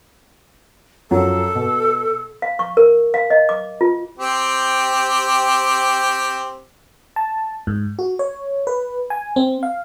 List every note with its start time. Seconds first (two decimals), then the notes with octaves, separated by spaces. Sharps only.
1.11 F#2 F3 F#3 A4
1.55 B2
2.42 F5
2.59 C#6
2.77 A#4
3.14 F5
3.30 D#5
3.49 D6
3.81 F4
4.18 C4 G4
7.16 A5
7.67 G#2
7.99 F#4
8.19 C#5
8.67 B4
9.10 G#5
9.36 C4
9.63 F5